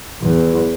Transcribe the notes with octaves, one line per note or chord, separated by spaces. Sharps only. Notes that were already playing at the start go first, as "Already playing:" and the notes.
E2